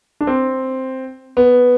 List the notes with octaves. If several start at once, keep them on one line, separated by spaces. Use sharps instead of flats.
D4
C4
B3